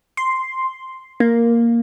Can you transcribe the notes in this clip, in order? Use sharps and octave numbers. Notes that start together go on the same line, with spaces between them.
C6
A#3